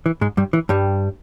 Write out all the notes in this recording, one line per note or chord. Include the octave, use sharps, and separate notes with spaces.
E3
G#2 G#3
G2 G3
E3
G2 G3